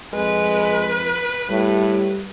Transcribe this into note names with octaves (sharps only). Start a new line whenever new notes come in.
F2 G#3 B4
A2 G3